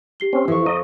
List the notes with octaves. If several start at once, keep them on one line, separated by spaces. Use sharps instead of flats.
G4 C7 G7
C4 C#4
F2 E3 C#6
D#5 A#5